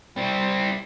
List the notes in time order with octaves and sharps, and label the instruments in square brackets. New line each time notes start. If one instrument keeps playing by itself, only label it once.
[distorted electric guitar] G3 C4